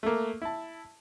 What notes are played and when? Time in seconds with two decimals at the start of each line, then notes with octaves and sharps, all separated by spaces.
0.03 A3 A#3
0.42 E4 A5